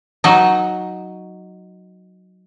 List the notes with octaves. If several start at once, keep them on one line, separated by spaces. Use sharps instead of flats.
F#3 D#4